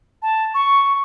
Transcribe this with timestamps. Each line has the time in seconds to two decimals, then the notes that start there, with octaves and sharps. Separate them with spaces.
0.22 A5
0.54 C#6